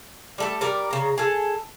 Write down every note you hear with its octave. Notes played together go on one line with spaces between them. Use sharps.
G3 A3 A4
G3 A#4 D5
C#3 A#5
G#4 A4